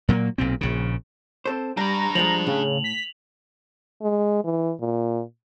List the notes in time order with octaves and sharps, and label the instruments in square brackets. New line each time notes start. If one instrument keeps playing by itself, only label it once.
[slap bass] A#2 F#3 A3 A#3
B1 A#2 C4
A#1 C#3
[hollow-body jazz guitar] C4 A4 C5
[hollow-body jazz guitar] G3 [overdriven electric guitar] D4 B5 [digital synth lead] A#5
[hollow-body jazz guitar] F3 G3 G#3 [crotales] F7 F#7
[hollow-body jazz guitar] A2 [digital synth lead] C#3
[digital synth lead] B6
[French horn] G#3
E3
A#2